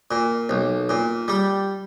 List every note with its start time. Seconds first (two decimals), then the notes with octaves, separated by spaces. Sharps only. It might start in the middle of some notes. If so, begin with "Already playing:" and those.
0.11 A#2
0.49 B1
0.89 A#2
1.28 G3